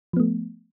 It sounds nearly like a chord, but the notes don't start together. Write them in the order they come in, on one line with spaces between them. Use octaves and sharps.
F3 B3 A3